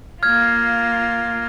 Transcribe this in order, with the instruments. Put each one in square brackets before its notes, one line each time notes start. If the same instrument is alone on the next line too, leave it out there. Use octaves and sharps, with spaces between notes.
[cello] A#3 F4 [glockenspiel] F6 G#6